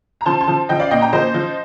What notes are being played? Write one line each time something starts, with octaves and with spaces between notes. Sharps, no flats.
A#5
F3 A5 C6
A5 C6
F3
F3 D#5 G5
D5 F5
A#2 D#5 G5
G5 A#5
F3 C5 D#5
F3